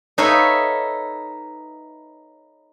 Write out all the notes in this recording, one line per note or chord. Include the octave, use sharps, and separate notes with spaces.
D#4 A4 B4 C#5 E5 F5